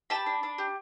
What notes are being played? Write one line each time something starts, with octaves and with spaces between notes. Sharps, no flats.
G4 A5 B5
D4
D4
G4